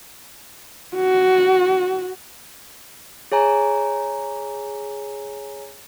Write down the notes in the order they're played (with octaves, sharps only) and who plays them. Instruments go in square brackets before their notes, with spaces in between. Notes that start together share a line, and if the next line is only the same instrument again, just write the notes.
[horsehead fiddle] F#4
[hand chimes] G#4 C#5 G#5 A#5